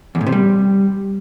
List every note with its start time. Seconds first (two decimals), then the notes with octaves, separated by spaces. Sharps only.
0.15 E2
0.21 A2
0.27 C3
0.32 G3